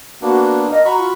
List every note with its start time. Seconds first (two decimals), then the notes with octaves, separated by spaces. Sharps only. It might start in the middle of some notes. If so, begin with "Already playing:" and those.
0.22 A#3 B3 D4 F#4
0.71 A#4 D#5
0.85 F#4 A#5 B5 C#6
0.98 F4